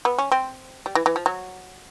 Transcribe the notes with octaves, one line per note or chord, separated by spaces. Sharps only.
B3
C#4
C4
G3
E3
E3
F3
F#3